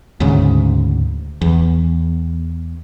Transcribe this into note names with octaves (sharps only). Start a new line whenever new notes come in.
D2 G#2 C#3
E2